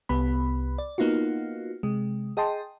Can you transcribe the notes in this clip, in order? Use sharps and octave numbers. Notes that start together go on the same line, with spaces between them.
C2 B3 B5
D5
A#3 B3 D#4 F4 F#4
C3 G#3
G#4 D#5 G5 A5 C6